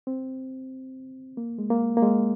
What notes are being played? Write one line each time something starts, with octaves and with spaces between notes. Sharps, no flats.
C4
A#3
G#3
A#3
A#3
G#3